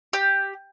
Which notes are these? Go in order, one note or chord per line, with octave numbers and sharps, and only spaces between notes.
G4